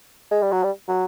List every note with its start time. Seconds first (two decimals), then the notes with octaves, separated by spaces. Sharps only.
0.31 G#3
0.42 G3
0.52 F#3
0.63 G3
0.88 F#3